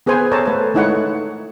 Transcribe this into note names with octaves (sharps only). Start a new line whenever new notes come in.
B3 G#4 B4 C5 G#5
A4 C5 C#5 A5 A#5
A3 B4 A5
G#3 A3 D#4 E4 C#5 F#5